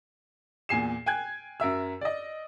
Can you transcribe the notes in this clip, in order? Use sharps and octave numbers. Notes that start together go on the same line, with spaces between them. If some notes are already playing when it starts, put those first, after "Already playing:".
E2 A#2 G#5 C7 E7
G5 G#5 F#6 G#6
F#2 A#4 E5 E6
D5 D#5